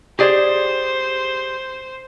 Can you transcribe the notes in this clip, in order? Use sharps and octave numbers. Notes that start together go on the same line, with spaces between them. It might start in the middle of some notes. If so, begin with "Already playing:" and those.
G4 G#4 C5 D5